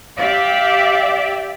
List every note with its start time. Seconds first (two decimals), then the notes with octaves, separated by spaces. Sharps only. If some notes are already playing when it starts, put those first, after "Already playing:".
0.18 G4 D5 E5 F5